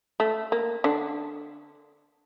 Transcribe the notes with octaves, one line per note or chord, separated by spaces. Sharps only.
A3
A#3
D3 D4